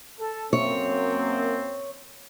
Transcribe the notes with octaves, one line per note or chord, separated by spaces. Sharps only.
A4
F#2 A#3 C4 C#5